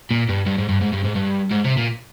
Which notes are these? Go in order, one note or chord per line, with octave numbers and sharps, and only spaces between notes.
A#2
G2
G2
G#2
G2
G#2
G2
G#2
G2
G#2
C3
A#2